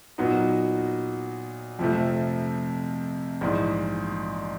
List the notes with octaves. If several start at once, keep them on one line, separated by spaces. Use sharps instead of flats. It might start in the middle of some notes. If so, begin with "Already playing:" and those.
A#2 F#3 B3 D#4
F2 C3 F3 A3
A#1 G#2 E3